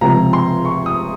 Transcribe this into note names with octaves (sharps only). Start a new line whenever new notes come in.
C#2 C3 F3 A#5
C6
C#6
D#6